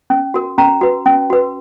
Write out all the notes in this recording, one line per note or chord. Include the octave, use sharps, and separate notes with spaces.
C#4
F#4 A#4
C#4 A#5
F#4 B4
C#4
F#4 B4